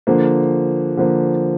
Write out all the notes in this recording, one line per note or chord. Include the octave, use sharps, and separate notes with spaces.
D3 F3 A#3
D3 F3 A#3